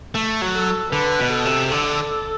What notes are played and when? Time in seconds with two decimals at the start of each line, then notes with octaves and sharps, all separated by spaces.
0.15 A3
0.42 F#3
0.54 A4
0.92 D3 B4
1.19 B2
1.32 A4
1.45 C3
1.71 D3 A4